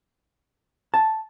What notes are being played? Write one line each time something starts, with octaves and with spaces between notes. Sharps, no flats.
A5